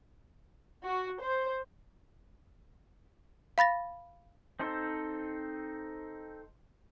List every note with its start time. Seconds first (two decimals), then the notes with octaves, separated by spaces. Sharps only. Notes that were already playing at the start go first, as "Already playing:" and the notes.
0.84 F#4
1.20 C5
3.58 F5 B5 A6 A#6
4.59 C4 D#4 A4 C5